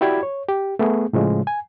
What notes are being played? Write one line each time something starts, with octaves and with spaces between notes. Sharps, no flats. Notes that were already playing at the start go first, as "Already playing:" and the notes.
E4 F#4 G4 D5 B5 G#6
C#5
G4
A3 B3 G#4
A2 C#3 F3 G#3
G#5